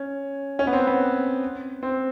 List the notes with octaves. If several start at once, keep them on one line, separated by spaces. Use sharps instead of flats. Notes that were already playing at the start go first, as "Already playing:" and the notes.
Already playing: C#4
C#4
B3
C4
B3
C4